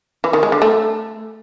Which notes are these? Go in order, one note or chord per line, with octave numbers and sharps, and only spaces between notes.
E3
D#3
G#3
D3
A3